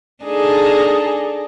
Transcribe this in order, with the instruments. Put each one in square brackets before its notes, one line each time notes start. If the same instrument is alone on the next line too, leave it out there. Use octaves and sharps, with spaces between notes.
[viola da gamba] D4 D#4 A4 [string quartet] G#4